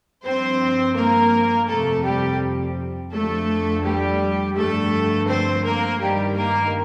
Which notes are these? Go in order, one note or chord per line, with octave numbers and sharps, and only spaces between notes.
G2 F3 C4 C5
A#3 A#4
F2 C3 F3 A3 A4
G3 G4
F2 D3 F3 A3 A4
G3 G4
G2 D3 F3 A3 A4
C4 C5
A#3 A#4
G2 D#3 G3 G4
A#3 A#4